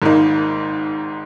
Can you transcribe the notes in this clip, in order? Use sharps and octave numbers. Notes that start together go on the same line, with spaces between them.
G#1 G#2 D#3 A#3 D#4